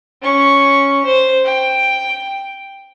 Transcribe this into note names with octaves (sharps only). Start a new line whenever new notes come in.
C#4 C#6
C5
G5